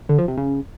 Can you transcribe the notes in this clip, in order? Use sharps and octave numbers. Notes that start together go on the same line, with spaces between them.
D3
F3
C3
C#3